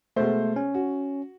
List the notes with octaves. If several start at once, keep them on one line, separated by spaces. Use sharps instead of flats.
B2 G#3 A3 C5
C#4
F#4